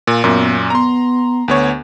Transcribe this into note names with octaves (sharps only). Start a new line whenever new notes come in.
A#2
F#2 A#2 B3
B3 A#5 C6
D2 B3 C#5